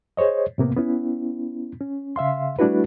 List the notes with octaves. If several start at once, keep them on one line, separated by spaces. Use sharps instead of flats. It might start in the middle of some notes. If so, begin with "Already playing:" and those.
G#4 C5 C#5 D#5
A2 C3 A#3 B3
B3 C#4 E4
C#4
C#3 E5 F5 C6
G3 A3 D4 E4 F#4 B4